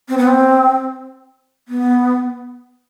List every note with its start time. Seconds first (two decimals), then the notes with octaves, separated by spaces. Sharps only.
0.09 C4
0.18 B3
0.27 C4
1.68 B3